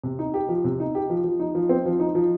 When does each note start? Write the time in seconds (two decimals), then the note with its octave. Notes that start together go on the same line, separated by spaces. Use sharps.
0.03 C3
0.19 D#4
0.34 G4
0.49 F3
0.64 C3
0.80 D#4
0.95 G4
1.10 F3
1.24 F3
1.40 D#4
1.55 F3
1.69 C4
1.85 F3
2.00 D#4
2.15 F3